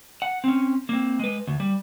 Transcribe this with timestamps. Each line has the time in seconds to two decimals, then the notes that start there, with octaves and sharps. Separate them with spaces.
0.22 F#5
0.44 C4 C#4
0.89 A#3 C4
1.19 G#3 B4
1.47 D2
1.60 G3